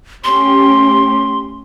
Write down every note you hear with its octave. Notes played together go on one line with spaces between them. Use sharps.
A3 C#4 G4 C6